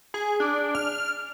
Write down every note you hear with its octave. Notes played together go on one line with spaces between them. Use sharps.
G#4
D4
F6